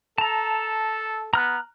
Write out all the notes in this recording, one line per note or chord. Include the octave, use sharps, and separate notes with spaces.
A4 A5 A#5
B3 A#5 F6 F#6